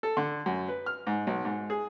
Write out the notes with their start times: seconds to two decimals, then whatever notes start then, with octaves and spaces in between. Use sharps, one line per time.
0.03 A4
0.17 D3
0.46 F#2
0.68 B4
0.86 F6
1.07 G#2
1.27 B1
1.45 G#2
1.70 G#4